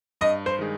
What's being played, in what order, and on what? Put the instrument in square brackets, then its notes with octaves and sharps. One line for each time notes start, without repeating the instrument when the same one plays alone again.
[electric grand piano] G2 [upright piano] D#5
[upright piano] C5
[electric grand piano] D#3 G#3 D#4 G#4